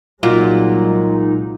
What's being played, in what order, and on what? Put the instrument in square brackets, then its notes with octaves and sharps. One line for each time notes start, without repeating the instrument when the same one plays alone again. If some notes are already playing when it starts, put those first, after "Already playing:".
[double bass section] C2 F#3 G#3 [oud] A#2 [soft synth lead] D#4 [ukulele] F4 F#4